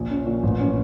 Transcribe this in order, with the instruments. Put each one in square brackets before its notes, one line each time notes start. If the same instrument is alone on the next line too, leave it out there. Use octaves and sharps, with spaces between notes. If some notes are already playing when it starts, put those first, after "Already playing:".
Already playing: [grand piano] A#1
C#4
A#2
A1
C#4